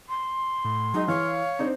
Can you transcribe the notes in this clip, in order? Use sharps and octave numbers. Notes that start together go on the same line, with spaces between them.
C6
A2
F#3 G#3 D#4 G#4 D#5
E3 C#5 F5
C4 D4 D#4